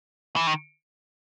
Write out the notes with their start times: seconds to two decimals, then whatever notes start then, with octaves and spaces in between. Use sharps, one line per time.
0.36 E3
0.47 D#3